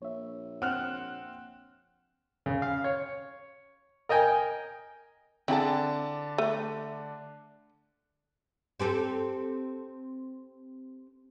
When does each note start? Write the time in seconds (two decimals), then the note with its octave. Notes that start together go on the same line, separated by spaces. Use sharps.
0.02 A#1 C#5 E5
0.62 C4 F#5 F6 F#6
2.46 C#3
2.62 F5
2.84 C#5
4.09 A#4 D#5 G5 G#5
5.48 D3 C4 D4 E4 G#4 A5
6.38 A3
8.80 C4 G4 A4